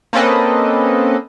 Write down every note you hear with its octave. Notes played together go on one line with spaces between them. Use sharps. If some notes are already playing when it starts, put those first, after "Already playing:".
A#3 C4 C#4 A4 B4 D#5